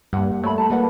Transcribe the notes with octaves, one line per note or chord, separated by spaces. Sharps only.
G2 G3 A#3 F#5
A3 C#5 D5 B5
A5 A#5
A#3 A4 B4 D5 F#5